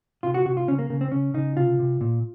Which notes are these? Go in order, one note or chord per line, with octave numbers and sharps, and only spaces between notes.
C3 F4
F#4
C3 F#4
F4
C#3 C#4
A#3
C#3 A#3
C4
C#3 C#4
C#3 D#4
C3 F4
C3
A#2